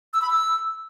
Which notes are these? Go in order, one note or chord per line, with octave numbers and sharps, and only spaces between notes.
E6
B5
E6